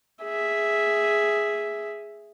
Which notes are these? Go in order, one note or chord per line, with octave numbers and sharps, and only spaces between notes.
G#4 E5